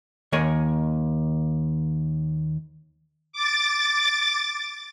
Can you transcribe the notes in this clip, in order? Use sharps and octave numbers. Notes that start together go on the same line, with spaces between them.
D#2 D#3 A#4 C#5 G#5
D6 A6